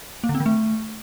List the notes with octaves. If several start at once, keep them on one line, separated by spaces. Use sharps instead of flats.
A#3
D3
C4
D#3
A3